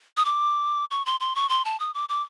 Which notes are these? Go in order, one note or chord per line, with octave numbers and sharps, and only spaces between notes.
D#6
D6
C#6
C6
C6
C#6
C6
A5
D#6
D6
D6